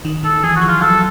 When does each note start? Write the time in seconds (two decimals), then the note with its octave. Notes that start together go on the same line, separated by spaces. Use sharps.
0.05 D#3
0.23 D#3 A4
0.43 E3 G#4
0.56 F#4
0.61 F3
0.68 F4
0.81 F#3 A4